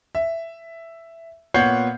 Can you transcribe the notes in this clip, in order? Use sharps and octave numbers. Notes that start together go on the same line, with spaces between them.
E5
A#2 B3 C#5 F#5 G6 C7